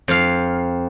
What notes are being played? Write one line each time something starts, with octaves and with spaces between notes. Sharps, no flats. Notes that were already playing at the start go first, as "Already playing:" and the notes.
F2 F5